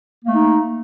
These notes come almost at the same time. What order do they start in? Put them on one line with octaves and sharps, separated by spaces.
A#3 A3 D#4